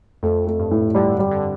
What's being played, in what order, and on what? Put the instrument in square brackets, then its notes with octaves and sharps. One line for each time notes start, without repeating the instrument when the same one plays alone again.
[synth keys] F2 [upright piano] A3
[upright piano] A3
[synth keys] G2
[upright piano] A2
[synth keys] D3 [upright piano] G3
[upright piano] G3
[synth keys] D3